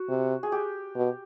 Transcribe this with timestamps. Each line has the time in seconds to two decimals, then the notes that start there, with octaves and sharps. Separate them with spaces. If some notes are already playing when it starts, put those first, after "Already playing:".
Already playing: F#4
0.09 C3
0.43 G#4
0.52 G4
0.95 B2